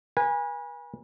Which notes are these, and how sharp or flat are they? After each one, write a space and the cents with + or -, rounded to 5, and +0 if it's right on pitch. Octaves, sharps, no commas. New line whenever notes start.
B4 -40 G#5 -20